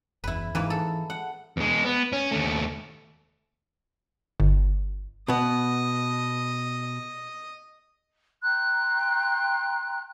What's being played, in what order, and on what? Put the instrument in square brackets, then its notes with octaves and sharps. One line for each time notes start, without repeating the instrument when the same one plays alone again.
[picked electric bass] F#1 E2 [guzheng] E4 B4
[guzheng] G#2 A#3 B4 [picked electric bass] E3
[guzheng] A4
F#5
[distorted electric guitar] E2 G#3
B3
C#4
D#2 A3
[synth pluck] G1
[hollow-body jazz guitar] B2 B3 [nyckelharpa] D#5
[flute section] G5 A#5 C6 F#6